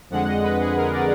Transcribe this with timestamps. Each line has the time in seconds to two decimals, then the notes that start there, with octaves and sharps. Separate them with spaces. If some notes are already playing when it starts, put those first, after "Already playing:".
0.10 F2 D3 G#3 F#5
0.27 D#5
0.43 B4
0.60 G#4
0.77 A#4
0.92 D5